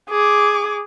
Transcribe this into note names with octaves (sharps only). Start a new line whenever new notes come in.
G#4 D6